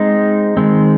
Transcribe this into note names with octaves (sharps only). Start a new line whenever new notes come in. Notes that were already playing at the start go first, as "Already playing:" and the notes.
Already playing: G#3 C4 D#4
D#3 G#3 C4